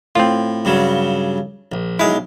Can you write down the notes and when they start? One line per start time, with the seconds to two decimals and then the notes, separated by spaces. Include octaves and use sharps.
0.15 A2 C4 F4
0.65 G2 C#3 F#3
1.72 A#1
1.99 B1 G#3 E4 F5